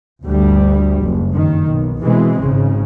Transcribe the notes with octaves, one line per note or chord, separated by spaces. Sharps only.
D2 G2 G3
F#1
G2 D#3
B1
B2 E3 G#3 C4
G#1 C#3